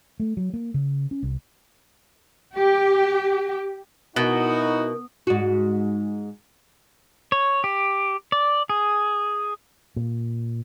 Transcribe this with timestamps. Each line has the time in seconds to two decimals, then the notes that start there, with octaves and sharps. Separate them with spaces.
0.20 A3
0.37 F#3
0.54 A#3
0.74 C#3
1.11 C#4
1.23 C2
2.54 G4
4.16 B2 D#4 E4 F#4 A#4
5.27 G#2 F#4
7.32 C#5
7.64 G4
8.32 D5
8.70 G#4
9.96 A#2